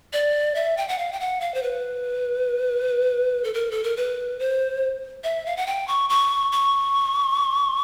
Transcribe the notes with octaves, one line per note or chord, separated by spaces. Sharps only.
D5
E5
G5
F#5
F5
G5
F#5
F5
C5
B4
A4
A#4
A4
A#4
B4
C5
E5
F5
F#5
G5
C#6
C#6
C#6